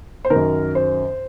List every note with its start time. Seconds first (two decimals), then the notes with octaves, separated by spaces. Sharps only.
0.25 C5
0.30 D#3 A#4
0.35 F#2
0.75 C5